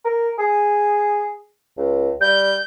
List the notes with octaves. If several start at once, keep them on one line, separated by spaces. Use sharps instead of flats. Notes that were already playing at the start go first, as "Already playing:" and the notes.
A#4
G#4
C#2
G3 G6